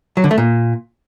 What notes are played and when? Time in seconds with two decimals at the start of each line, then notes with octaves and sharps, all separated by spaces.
0.17 F#3
0.24 D3
0.31 A3
0.38 A#2